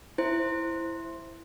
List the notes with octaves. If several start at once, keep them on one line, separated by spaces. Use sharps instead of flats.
E4 C5